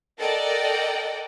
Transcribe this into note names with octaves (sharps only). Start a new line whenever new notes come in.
A4 A#4 D5 D#5 F#5 G5